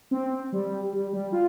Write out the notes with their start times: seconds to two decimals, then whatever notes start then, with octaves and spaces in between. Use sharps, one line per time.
0.11 C4
0.52 G3
0.93 G3
1.13 G3
1.32 F4